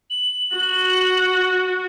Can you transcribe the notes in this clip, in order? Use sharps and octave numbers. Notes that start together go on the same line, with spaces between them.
F#7
F#4